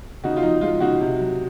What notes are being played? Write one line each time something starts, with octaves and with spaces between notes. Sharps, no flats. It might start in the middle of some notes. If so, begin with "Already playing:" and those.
C#3 D#4 F#4
F4
F3 D#4
G#3 F4
C#3 D#4 F#4
C3
F#3